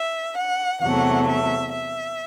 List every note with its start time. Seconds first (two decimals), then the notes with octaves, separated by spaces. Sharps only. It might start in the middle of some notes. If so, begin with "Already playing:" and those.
Already playing: E5
0.37 F#5
0.82 E2 C3 F#3 A3 F#5
1.27 E5
1.71 E5